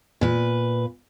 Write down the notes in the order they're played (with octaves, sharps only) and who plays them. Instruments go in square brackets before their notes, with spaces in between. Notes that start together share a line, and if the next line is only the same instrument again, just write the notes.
[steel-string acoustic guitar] A#2 B4